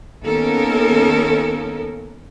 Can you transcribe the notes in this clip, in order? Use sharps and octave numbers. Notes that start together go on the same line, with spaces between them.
D#2 B3 C#4 A4 A#4